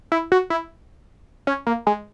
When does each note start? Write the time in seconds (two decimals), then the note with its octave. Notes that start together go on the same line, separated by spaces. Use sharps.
0.12 E4
0.32 F#4
0.50 E4
1.47 C#4
1.67 A#3
1.87 G#3